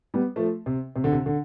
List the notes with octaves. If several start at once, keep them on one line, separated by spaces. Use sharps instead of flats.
G3 B3
F3 A3
C3
C3
D3
C3
D3